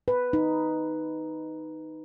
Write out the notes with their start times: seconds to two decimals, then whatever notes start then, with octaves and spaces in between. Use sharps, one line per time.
0.08 B4
0.33 D#4